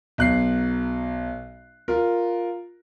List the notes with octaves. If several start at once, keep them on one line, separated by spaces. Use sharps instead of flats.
B1 F#6 C7
F4 A#4